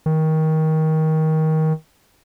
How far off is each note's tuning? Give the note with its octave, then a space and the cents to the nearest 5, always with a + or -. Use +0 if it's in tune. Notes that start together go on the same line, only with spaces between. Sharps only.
D#3 +20